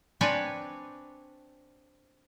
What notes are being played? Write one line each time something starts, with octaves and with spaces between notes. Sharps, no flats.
C4 D4 B4 C#5 G5 G#5